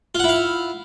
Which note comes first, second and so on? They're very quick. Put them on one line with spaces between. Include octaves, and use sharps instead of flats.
F4 F#5 E4 F5